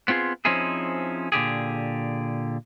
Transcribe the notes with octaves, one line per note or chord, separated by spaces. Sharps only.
B3 C4 F4 G4 G#4
F3 C4 C#4 D#4 E4 G#4
A#2 D3 G4 G#4